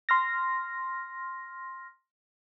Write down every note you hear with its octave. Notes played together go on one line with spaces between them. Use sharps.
C6 F6 A#6